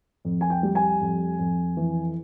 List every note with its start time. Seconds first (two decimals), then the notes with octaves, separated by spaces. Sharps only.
0.25 F2
0.41 G#5
0.50 G5
0.63 G3
0.75 G#5
1.01 F2
1.39 F2
1.77 E3